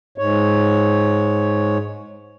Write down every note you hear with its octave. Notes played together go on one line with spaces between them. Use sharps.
G#2 C#5